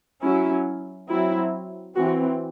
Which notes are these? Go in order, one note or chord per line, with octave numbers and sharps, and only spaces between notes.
F#3 C#4 E4
F#3 C4 E4
E3 C4 F#4